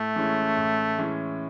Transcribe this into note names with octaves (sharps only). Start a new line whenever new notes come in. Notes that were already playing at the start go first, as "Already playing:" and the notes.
Already playing: A2 A3
E3 G#3 C#4
A2
E3 G#3 C#4